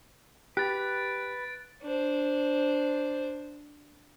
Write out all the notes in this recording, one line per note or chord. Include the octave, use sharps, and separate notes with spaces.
G4 B4 F#6 A6 D7
D4 C5